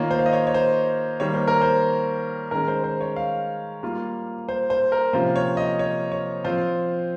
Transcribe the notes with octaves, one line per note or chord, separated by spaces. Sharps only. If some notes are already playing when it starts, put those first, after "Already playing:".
Already playing: D#3 A#3 F4 C#5
C5
F5
D#5
C#5
C#5
C5
D#3 G3 A#3 C#5
C5
A#4
C5
D#3 G#3 C#4 A#4
C5
C5
C#5
F5
G3 A#3 F4
C5
C5
A#4
C3 F3 A#3 C#4 F4 C5
C#5
D#5
C#5
C#5
F3 C4 F4 C5